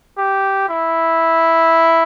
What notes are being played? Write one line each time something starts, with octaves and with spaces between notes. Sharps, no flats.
G4
E4